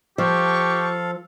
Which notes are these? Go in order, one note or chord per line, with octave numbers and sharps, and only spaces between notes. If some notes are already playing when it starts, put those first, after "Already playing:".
F3 G4 A4 F5 C#6